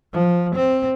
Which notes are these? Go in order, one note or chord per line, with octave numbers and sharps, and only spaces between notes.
F3
C4